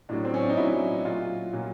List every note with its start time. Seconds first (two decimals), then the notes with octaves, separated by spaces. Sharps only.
0.09 A2 F#3 D4
0.25 C4
0.34 C#4
0.42 D4
0.49 D#4
0.57 A2 F#3 E4
1.05 A#2 F#3 F4
1.53 A#2 F#3